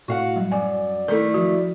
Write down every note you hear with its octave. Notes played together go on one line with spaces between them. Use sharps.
A2 F#4 F5 F#5
F#3 G3
F#2 D5 G#5
D#3 A3 E4 A#4
F3 F#4